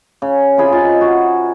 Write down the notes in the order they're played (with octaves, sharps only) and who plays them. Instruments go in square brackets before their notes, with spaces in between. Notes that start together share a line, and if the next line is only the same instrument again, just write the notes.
[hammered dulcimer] C#3
C3 F4 G#4 B5
D#4 F4
F#4